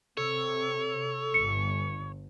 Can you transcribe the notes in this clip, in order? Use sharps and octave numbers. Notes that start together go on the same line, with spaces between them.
C3 A4 C#5
G1 C#7